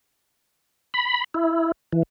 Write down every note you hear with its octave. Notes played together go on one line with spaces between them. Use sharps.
B5
E4
E3